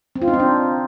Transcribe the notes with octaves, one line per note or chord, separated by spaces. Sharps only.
C4
F4
D#4
C4
D4